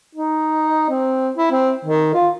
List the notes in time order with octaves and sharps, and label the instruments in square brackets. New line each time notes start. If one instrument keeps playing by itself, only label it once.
[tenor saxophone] D#4
C4
E4
C4
D#3
F4